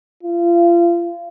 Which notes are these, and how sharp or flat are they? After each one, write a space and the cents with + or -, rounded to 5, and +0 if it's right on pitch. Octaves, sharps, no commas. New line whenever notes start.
F4 -30